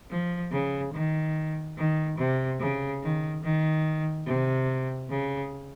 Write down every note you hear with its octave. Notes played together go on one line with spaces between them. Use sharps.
F3
C#3
D#3
D#3
C3
C#3
D#3
D#3
C3
C#3